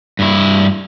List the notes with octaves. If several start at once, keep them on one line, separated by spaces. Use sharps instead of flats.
G2 E4